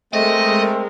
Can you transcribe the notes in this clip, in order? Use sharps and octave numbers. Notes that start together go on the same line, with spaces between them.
G#3 A3 C4 A#4 D#5